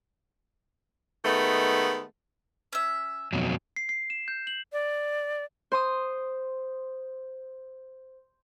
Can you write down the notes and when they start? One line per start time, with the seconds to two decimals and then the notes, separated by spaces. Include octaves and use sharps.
1.24 D#3 G#3 A3 B3
2.73 C#4 E5
3.33 F2 B2 F#3
3.76 C7
3.89 C7
4.10 E7
4.28 G6
4.47 F#7
4.73 D5
5.72 C5 C6 D#6